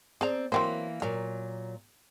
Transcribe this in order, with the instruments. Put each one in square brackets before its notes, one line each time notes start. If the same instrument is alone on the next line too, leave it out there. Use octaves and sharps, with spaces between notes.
[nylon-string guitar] C4 D5 [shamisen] G#4 A#5
[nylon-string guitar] E3 A#3 [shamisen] F#3 C4 C5
[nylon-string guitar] A#2 F#3 [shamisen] A#4